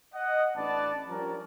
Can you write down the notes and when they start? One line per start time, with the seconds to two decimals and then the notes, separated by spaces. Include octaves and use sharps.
0.14 D#5 F#5
0.56 A1 D4 B4 D5 A5
1.09 F3 G3 C#4 A#4